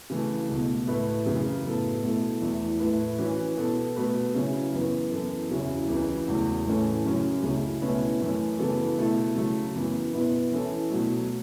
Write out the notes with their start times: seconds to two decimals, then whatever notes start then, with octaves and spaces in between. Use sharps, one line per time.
0.10 C#3 E3 A3
0.49 C#2 B2 A3
0.87 A2 A3 E4 B4
1.25 F#2 C#3 E3
1.64 A2 F#3 B3 A4
2.03 B2 A3 E4 A4
2.42 E2 E3 A3 E4
2.80 A2 A3 E4 B4
3.18 E3 C#4 F#4 B4
3.57 B2 B3 F#4 A4
3.96 B2 A3 F#4 B4
4.34 C#3 F#3 C#4 E4
4.73 F#2 E3 B3
5.11 F#2 E3 B3 A4
5.50 E2 C#3 F#3 C#4 E4
5.88 C#2 C#3 E3
6.28 E2 C#3 F#3 A3
6.66 A2 E3 A3 C#4 A4
7.05 F#2 C#3 F#3 C#4
7.43 C#2 C#3 A3 C#4 E4
7.82 B2 A3 C#4 E4 B4
8.20 F#2 E3 A3 C#4
8.59 C#3 E3 B3 F#4 A4
8.97 B2 A3 E4 A4
9.36 C#3 F#3 A3
9.74 F#2 E3 B3
10.13 B2 B3 E4 B4
10.51 E3 C#4 E4 A4
10.90 B2 F#3 A3